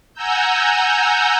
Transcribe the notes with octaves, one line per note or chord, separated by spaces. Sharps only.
F#5 G#5 A#5 E6 G6